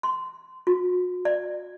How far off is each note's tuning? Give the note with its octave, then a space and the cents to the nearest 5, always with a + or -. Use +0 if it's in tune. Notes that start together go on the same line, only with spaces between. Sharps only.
C6 -15
F#4 -40
D5 +25